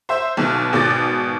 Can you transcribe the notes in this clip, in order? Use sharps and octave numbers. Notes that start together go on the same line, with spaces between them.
C5 E5
B1 B2
G#1 B2 D6 A6